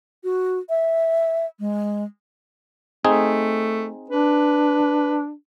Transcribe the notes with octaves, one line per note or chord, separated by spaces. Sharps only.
F#4
E5
G#3
A3 C4 D#4 G#4
D4 B4